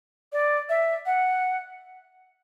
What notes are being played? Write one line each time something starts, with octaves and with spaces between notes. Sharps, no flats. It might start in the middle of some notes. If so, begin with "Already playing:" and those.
D5
E5
F#5